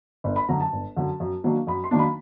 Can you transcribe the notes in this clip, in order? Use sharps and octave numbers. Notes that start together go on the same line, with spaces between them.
G1
B5
F#2 D3 F#3 A#5
A5
G1
F#2 D3 F#3
F#2
D#3 F#3 A#3 D4
F#2 B5
C6
D#3 F#3 A#3 D4
B5